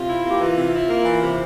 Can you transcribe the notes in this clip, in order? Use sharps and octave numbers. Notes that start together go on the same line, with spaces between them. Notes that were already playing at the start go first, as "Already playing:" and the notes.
Already playing: C3 F4
E4
A#3 G4
E3 F4
C3
E4
A#3
E3
C3